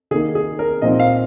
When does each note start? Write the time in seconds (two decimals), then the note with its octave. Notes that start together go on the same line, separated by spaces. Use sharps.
0.11 D#3 G#4
0.14 A#3 D#4
0.35 G#4
0.59 A#4
0.82 A#2 F3 C4 D#4 D#5
1.00 F5